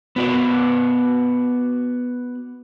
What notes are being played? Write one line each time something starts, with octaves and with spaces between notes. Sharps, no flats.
B3 F#4 D5